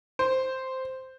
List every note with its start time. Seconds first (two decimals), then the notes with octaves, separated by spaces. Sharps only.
0.19 C5